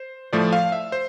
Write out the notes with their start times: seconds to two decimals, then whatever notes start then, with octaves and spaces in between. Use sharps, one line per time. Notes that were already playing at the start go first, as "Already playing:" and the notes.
Already playing: C5
0.33 A2 F3 A3 D5
0.53 F5
0.72 E5
0.92 C5